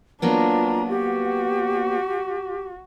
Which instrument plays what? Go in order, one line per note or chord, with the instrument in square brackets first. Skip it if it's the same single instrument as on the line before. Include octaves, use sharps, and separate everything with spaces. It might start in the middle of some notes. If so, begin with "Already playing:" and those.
[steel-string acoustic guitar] F#3 A#3 B3 [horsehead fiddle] D4 F4 [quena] A#5
[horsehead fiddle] F#4 [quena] G4